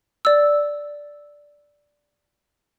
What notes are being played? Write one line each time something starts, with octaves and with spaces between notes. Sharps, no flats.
D5 E6